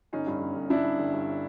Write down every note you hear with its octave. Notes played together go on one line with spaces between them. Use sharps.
G1 C#4 D#4
G2
G1
G1
G1 D4 E4
G2
G1
G2